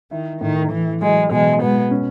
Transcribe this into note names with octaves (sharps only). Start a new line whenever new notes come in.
D#3 E4
A2 D#3
E3 E4
E3 F#3 G#3
B2 E3 G#3
B2 G#3 B3
C#4